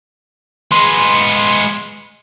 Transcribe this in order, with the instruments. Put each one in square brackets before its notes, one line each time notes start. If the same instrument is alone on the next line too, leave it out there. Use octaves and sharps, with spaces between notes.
[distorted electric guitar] G#3 B3 [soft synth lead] C6